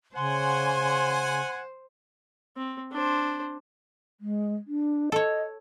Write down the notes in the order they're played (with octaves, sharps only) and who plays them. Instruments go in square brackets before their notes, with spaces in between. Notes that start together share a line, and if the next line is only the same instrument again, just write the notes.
[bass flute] C#3 [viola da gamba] C5 [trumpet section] F#5 G#5 [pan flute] C6
[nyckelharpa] C4
D4 C5
[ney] G#3
D4
[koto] A4 C#5 [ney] D#5